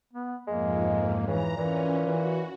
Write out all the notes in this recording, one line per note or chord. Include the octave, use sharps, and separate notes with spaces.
B3
F2 G#2 G#3 A#3
C#3 E3 A#5
A#2 E3 C#4
E3 F#4